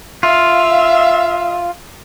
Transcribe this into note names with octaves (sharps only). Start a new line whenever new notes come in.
F4 E5 F5